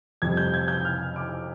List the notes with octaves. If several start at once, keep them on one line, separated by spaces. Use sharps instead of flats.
F2 C3 G3 G#6
G6
G#6
G6
F6
D6